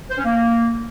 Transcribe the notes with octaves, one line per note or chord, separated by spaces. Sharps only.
C5
C#4
A#3